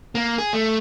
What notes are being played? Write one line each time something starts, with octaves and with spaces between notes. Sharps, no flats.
A#3
G#4
A3